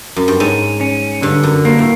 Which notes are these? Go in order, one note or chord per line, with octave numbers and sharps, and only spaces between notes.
F#2
G2
G#2 C#4
C#4
G2 D3
F#2
G2 A#3
A2